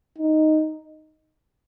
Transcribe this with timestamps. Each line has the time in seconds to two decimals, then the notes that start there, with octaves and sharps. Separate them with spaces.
0.18 D#4